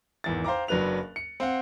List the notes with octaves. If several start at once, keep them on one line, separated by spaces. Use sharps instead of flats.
G#1 E2 A6
C5 F5 G5 A#5 D6
F#1 F#3 D4 B4 F#6 F7
C#7
C4 F5 F#5